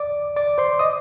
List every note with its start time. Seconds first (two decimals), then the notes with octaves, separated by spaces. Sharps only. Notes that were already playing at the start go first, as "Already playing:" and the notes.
Already playing: D5 D6
0.36 D5 D6
0.58 C5 C6
0.79 D#5 D#6